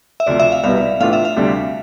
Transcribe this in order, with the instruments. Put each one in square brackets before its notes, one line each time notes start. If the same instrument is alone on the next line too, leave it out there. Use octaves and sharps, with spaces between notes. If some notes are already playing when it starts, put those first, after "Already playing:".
[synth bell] E5
[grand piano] D2 C3 F3 [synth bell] D5
[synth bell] E5
F5
[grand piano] C2 B2 G3 B3 [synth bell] F5
[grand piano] A2 E3 B3 D4 F4 [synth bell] F5
[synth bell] E5
F5
[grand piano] D2 C3 G3 D4 G4